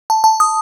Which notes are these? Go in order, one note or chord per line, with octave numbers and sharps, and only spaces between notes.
A5
A5
D#6